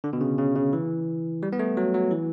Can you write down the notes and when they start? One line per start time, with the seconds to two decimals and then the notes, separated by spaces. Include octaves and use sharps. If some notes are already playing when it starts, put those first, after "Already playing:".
0.04 D3
0.13 B2
0.21 C#3
0.38 C#3
0.55 C#3
0.73 E3
1.43 G3
1.53 B3
1.59 A3
1.77 F#3
1.94 F#3
2.11 E3